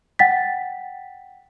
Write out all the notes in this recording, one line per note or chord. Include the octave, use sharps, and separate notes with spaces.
F#5 G5 A6 B6